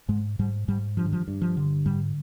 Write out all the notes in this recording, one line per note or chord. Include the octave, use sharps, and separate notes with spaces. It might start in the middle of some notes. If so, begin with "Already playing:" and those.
G#2 G#3
G#2 G3
G#2 G3
G2 F3
D#3
F3
G2
F3
D3
G#2 G3